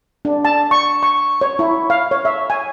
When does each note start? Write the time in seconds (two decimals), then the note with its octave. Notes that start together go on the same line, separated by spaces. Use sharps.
0.25 D4
0.45 A5
0.71 C#6
1.03 C#6
1.41 C#5
1.59 E4
1.90 F5
2.11 C#5
2.25 E5
2.50 G#5